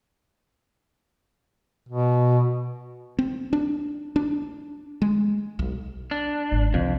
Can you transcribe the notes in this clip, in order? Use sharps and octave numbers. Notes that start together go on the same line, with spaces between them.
B2
C4
D4
D4
G#3
B1
D4
G#1
C2 F2